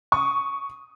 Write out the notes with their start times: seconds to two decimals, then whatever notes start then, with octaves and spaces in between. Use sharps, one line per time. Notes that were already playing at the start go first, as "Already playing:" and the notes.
0.12 C#6 D#6